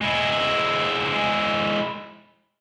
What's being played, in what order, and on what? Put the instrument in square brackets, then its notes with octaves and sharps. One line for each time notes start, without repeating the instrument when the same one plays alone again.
[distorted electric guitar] G#3 E4